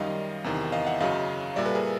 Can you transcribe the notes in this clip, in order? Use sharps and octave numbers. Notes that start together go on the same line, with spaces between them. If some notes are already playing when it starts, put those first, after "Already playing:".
Already playing: F#2 D#3 G3 D#5 F5
E2 C3 D#3
D#5 F5
E5 F#5
F#2 C#3 F#3 D#5 F5
A#2 G3 D5 E5
A4 B4
G#4 A#4